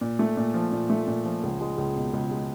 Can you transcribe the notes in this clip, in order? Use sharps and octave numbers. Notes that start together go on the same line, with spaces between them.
A#2
A3
A#2
F3
A#2
A3
A#2
F3
C#2
G#3
C#2
B2
C#2
G#3